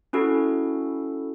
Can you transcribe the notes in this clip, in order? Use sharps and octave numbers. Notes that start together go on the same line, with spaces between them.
C#4 E4 F#4 A4